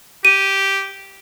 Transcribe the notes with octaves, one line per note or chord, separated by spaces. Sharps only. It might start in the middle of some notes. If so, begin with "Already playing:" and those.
G4 D#7